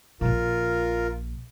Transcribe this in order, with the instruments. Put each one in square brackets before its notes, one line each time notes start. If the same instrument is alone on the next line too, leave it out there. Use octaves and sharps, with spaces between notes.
[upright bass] A#1 A#2 [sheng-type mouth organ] F4 A#4